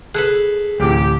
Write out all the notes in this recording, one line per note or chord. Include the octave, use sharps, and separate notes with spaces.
G#4 A4 B4 F#6
A1 D2 C3 E3 G4